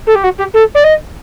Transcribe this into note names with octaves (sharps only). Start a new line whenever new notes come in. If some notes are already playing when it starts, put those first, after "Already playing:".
A4
G4
F#4
G4
A4
D5
D#5